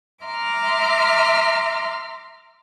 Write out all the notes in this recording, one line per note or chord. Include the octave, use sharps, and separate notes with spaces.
E5 A#5 C6 D6 F6